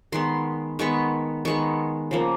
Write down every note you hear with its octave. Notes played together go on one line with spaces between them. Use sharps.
D#3 G#3 B3 C6
D#3 G#3 B3 C#6
D#3 G#3 B3 C#6
C#3 F3 A#3